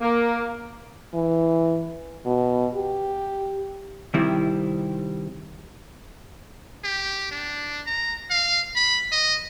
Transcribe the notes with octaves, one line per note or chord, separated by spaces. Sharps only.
A#3
E3
B2
G4
C3 D#3 G3 C4 E4
G4
D4
A#5
F5
B5
D#5